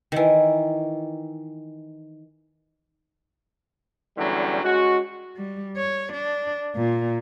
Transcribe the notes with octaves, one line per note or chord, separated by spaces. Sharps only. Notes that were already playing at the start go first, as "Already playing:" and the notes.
D#3 E3
E2 D3 F#3 G3 C#4
G#3 C#4 F#4
G3
C#5
D4
A#2